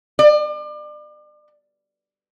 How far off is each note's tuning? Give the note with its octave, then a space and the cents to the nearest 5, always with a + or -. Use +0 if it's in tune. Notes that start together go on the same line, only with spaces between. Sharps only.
D5 +35